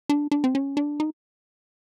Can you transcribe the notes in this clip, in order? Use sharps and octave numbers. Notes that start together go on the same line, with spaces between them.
D4
D4
C4
C#4
D4
D#4